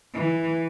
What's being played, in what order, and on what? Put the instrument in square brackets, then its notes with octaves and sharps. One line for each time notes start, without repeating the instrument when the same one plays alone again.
[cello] E3